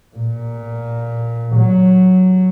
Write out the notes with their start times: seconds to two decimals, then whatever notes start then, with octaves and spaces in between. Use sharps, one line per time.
0.17 A#2
1.56 F#3